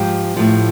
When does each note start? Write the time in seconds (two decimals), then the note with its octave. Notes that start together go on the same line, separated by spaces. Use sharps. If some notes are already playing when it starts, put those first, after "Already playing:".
Already playing: G#2 F3 G4
0.37 A2 F3